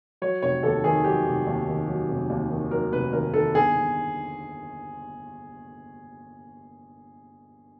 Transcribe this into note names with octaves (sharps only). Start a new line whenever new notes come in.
F#3 C#5
F1 C#5
D#2 A4
D#3 G#4
F#3 G4
F1
D#2
D#3
F#3
F1
D#2
D#3
F#3 A#4
F1 B4
D#2 A#4
D#3 A4
G1 G#4
G1